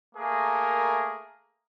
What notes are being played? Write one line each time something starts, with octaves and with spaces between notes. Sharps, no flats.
A3 A#3 G#4 A#4